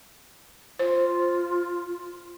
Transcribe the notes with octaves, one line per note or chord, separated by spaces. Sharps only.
F4 C5